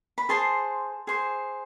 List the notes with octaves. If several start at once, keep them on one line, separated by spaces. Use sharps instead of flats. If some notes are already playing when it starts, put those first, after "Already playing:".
B5
G#4 C5 A5 C6
G#4 C5